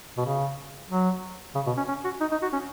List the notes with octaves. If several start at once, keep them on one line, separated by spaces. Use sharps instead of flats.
B2
C#3
F#3
C#3
B2
C#4
C#4
F#4
D#4
D#4
F#4
C#4